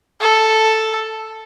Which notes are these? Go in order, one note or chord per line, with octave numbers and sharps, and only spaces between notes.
A4